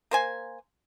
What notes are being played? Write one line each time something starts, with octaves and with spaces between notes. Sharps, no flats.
A#3 C5 G#5